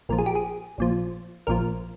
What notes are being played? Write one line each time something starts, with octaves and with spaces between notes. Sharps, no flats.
A#1 A#2 F3 A#4
G#4
G4
G#4
A#1 A#2 F3
A#1 A#2 F3 A#4